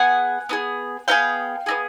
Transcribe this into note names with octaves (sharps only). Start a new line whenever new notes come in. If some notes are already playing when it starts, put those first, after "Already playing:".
Already playing: B3 G#4 F#5 G#5
B3 D#4 G#4
B3 D#4 G#4 F5 G5
B3 D#4 G#4